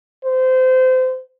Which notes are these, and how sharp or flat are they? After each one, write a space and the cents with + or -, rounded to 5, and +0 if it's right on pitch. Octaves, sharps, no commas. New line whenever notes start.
C5 -25